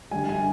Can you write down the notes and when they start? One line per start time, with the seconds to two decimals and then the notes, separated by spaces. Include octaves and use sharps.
0.11 D3 G3 G#5
0.29 G#5